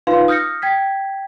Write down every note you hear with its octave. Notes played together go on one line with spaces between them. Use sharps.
D#4 F4 B4 F5 C6
D#6 F6 G6 A#6 C#7
G5 G#6 B6